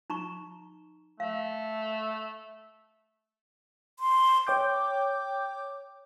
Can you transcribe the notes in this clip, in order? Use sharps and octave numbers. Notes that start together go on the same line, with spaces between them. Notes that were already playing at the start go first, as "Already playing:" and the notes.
D#4 A#5 C#6
A3 F5
C6
C#5 G5 D6 G6